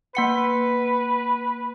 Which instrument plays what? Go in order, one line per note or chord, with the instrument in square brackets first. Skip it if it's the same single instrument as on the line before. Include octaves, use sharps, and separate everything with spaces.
[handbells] A#3 F#5 C#7 [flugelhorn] B4